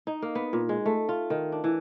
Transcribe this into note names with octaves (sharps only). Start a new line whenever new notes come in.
D#4
A#3
B3
A#2
G#3
A3
F4
D#3
D4
E3